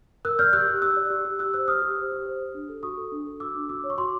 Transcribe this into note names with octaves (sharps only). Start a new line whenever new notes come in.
A#4 E6 F#6
D5 F6 G6
G4 E6 F#6
G4
G4 E6 F#6
D5
G4
G4
G4 E6 F#6
C5 E6 F#6
G4 D#6 F6
G4
C5
G4
C5
G4
D4
A4
F#4 C#6 D#6
A4
D4
A4
F#4 D6 E6
D4
F#4 D6 E6
C#5
C#6
F#4 C6 D6